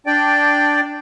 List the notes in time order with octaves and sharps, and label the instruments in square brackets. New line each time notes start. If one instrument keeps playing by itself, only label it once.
[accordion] D4 D5 G5